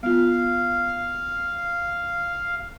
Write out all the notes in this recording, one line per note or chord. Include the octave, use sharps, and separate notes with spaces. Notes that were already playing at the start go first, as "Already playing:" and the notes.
B3 F4 F5